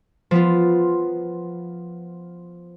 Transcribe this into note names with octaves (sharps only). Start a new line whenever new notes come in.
F3 B3 F4